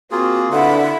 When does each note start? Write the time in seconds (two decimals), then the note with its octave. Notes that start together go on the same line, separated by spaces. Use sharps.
0.12 A#3 C4 F4 F#4 G#4
0.52 D3 E4 A4 B4 F#5